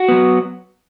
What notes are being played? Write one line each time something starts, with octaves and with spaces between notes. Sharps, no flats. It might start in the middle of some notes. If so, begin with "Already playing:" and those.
Already playing: F#4
F#3 B3